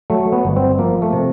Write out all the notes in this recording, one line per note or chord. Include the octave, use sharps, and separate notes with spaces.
F#3 A3
B3
G1
C4
F3 A#3
A3
C3